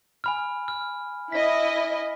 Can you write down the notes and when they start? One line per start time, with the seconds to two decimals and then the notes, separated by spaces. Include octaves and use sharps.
0.24 G#5 B5 F6
0.68 F6
1.32 E4 D#5 B6